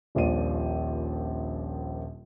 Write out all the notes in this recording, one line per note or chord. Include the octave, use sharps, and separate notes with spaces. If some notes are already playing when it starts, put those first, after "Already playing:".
D#1 A#1 F3 D5 D#7